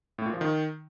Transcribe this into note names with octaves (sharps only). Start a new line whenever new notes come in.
A2
A#2
F3
D#3